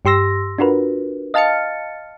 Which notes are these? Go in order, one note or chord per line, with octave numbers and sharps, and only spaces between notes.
G2 G4 C6 E6 A#6
D4 F4 F#4 A#4 B4
D#5 F5 A5 F6 A6 C#7